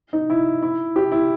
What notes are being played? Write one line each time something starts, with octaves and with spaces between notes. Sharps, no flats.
D#4
E4
E4
G4
E4